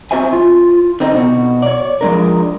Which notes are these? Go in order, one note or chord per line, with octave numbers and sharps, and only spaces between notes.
C4 F#4 C5 E5 G#5
F4
D3 C4 D#4
B2 F#4
C#5 D5
F3 G#3 D4 A#4